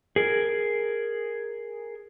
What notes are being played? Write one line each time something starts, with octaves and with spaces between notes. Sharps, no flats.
G#4 A#4